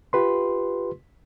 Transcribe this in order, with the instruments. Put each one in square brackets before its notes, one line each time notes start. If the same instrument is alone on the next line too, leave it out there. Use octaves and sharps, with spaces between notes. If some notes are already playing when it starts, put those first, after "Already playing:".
[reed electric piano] F4 G4 B4 C6